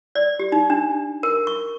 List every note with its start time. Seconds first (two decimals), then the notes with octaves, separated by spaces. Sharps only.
0.15 D5
0.39 G4
0.52 D#4
0.70 D4
1.23 A#4
1.47 C#6